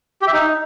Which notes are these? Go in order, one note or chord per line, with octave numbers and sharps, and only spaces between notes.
G4
E5
D#4